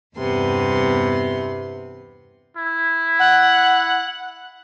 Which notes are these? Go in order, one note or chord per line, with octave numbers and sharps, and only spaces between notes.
E2 G2 C3 B3 C6
E4
F#5